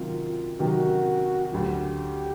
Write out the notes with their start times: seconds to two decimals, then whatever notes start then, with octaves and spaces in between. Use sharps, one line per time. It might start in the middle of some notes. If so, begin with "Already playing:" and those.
Already playing: C3 D#3 F#3 F4
0.59 C3 D#3 F#3 F#4
1.52 D2 D3 F#3 G4